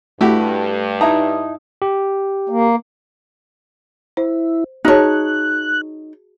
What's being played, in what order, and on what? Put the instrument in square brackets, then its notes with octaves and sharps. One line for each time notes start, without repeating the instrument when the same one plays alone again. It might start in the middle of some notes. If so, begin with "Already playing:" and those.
[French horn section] G2 [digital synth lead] A3 [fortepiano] E4 F#4 G4
[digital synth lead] D#4 [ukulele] E4 E5 A5 [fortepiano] A#5
[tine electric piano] G4
[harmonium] A#3
[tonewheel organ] E4 [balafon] C5
[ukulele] D#4 C#5 [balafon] F#4 G#4 A5 [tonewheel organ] F#6